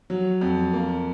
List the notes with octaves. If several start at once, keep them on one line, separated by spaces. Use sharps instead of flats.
F#3
F2
A#3